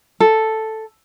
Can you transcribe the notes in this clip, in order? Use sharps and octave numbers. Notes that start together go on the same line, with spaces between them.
A4